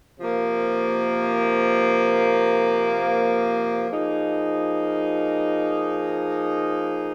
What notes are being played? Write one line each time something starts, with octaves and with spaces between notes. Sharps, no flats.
C3 F3 A#3
F3 A#3 D#4 G#4